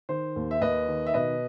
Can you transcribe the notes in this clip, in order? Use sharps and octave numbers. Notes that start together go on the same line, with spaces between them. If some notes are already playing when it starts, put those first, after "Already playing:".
D#3 C5
D#2
E5
D#2 B4 D#5
D#3
E5
B2 B4 D#5